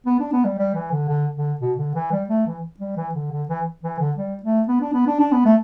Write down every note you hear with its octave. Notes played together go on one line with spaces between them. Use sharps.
B3
D4
B3
G3
G3
E3
D3
D3
D3
B2
D3
E3
G3
A3
E3
G3
E3
D3
D3
E3
E3
D3
G3
A3
B3
D4
B3
D4
D4
B3
A3